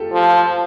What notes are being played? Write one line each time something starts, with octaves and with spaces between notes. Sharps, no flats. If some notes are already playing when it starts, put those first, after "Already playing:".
Already playing: F4 G4 A4
F3